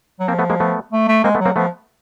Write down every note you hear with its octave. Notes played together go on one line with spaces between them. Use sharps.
F#3
F3 A#3 C4
A3 B3
G#3 A#3
A3 B3
A3
A3
G#3 A#3 C4
A3 B3
F#3
A#3 C4
F3 A3 B3